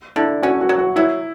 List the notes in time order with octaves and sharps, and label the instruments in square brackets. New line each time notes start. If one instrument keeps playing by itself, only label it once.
[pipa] D3 [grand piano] E4
[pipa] C#4 [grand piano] F#4
[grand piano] F#4
[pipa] F#3
[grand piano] F#4
[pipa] F#3 [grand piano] E4